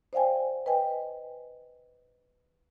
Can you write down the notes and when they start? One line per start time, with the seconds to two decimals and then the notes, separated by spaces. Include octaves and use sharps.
0.13 C5 D5 F5 G5 G#5
0.66 B4 D#5 G5 G#5